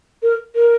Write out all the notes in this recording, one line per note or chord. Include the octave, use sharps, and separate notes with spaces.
A#4
A#4